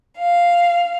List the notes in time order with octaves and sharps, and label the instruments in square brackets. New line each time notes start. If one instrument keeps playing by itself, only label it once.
[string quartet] F5